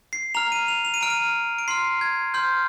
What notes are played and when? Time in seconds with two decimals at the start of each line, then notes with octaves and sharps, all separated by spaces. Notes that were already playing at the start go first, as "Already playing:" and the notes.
0.13 C7
0.34 A#5 F6 F7
0.52 D#7
0.68 F7
0.85 F7
0.94 D#7
1.01 A#5 F6 D7
1.10 D#7
1.59 D7
1.68 C6 F6 C7
2.01 G#6
2.34 C6 F6 G6